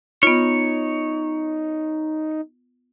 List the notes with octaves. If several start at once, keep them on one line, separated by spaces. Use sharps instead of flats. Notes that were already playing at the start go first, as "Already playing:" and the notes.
B3 D#4 F4 C#5